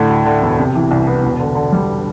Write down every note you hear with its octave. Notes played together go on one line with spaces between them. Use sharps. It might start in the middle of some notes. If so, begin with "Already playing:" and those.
Already playing: A2 D3
D2
D3
E1
C3
E3
C2
B3
E1
D3
D3
G3